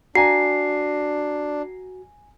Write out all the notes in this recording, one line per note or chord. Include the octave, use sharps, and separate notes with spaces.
D4 F#4 G#5 A#5 C7